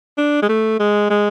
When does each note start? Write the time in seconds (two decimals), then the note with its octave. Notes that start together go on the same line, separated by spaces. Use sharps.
0.18 D4
0.42 G#3
0.49 A3
0.79 G#3
1.10 G#3